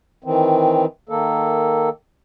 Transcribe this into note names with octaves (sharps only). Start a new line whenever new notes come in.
D#3 E3 C4
D#3 A#3 A4